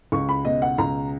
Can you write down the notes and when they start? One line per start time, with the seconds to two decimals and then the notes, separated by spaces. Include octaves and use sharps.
0.12 C#2 C#6
0.29 B5
0.45 B2 D#5
0.62 F#5
0.78 C#2 A#5